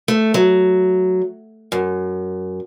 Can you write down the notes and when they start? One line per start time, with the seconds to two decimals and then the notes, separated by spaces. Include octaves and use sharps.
0.08 A3
0.34 F#3
1.72 F#2